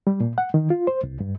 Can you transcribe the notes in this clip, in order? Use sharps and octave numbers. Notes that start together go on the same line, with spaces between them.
G3
A#2
F#5
D#3
F4
C5
C2
G2